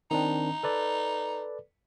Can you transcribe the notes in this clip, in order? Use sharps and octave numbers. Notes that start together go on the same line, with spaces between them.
D#3 C4 D4 D#4
A4 B4 D5